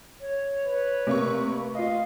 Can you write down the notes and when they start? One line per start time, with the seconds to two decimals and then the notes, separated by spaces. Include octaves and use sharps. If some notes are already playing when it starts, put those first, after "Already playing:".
0.21 C#5
0.66 B4
1.07 C3 A3 A#3 C#6
1.75 F4 D#5 F5